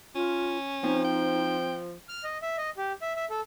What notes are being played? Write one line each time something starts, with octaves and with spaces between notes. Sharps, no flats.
C#4 F4
F3 C4 D#4
G5
F6
D#5
E5
D#5
G4
E5
E5
A4